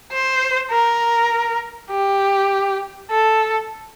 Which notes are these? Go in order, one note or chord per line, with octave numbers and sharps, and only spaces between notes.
C5
A#4
G4
A4